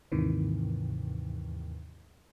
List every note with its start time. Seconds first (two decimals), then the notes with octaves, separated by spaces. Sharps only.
0.12 D#2 G#2 C3 D#3 E3